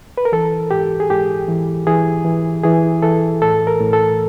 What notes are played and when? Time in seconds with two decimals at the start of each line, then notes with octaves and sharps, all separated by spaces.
0.18 B4
0.25 A#4
0.32 E3 A4
0.71 G#2 G4
1.00 G#4
1.10 G#2 G4
1.48 E3
1.87 E3 G#4
2.25 E3
2.64 E3 G#4
3.02 E3 A4
3.42 A2 A4
3.67 A#4
3.80 A2
3.93 A4